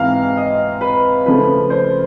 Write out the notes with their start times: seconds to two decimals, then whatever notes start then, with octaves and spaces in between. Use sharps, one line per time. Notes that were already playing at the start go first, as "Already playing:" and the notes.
Already playing: G#2 E3 G#3 C4 F5 A#5
0.37 D#5
0.81 B4
1.26 C#3 F3 A3 B4
1.70 C5